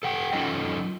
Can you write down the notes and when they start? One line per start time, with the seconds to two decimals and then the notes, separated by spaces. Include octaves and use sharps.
0.03 A4 F#5 G5
0.33 F#3 C#4 D#4 F4 A4 D#5